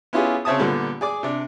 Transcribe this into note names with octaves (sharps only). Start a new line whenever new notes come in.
B3 C#4 E4 F4 G4 G#4
C#3 C4 C#5 E5 A5 D#6
A#2 D3 G3 B3
G#4 D5 D6
C3 D4